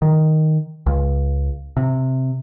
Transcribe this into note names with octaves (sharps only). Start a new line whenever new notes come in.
D#3
C#2
C3